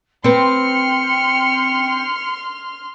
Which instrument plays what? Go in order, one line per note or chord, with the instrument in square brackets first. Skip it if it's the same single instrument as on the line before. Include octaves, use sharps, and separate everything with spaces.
[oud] C4 B4 [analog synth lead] G5 [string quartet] C6 F6 [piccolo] C#7